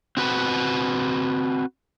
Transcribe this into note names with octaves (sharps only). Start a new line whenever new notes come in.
C4 F#4 B4